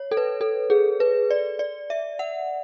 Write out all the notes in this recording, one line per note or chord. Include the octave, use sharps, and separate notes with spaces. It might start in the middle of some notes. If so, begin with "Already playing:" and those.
Already playing: C#5
A4
B4
A4
G#4
B4
D5
D5
E5
F#5